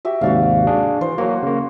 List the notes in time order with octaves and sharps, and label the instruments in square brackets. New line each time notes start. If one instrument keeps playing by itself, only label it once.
[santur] F#4 G4 E5
[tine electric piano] D#2 G#2 C3 [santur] F#4 D5 F5
[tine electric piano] D4 G#4
[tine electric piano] E3 [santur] C5
[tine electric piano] F#3 A#3 [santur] F#4
[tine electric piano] C#3 A#3